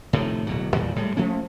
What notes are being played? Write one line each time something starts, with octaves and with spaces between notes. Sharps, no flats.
A2 C3 D#3 F3
D1 B2 F#3
E2 A#2 D#3 G3
A2 G3 G#3
F3 A3 A#3 C#4